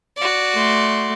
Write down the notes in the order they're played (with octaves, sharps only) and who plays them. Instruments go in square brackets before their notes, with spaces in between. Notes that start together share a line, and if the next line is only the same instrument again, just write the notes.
[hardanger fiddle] F#4 D5
[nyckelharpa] A3 C6